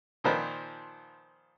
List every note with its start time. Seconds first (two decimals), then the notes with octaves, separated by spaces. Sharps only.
0.24 A#2 D#3 F3 B4 C5